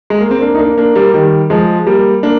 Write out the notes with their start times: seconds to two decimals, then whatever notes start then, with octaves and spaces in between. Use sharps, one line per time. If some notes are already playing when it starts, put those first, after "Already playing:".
0.10 G#3
0.20 A#3
0.31 C4
0.41 A#3 D4
0.55 D#4
0.59 A#3 D4
0.78 A#3 D4
0.95 G3 A#3
1.14 D#3 G3
1.50 F3 G#3
1.87 G3 A#3
2.23 A#3 D4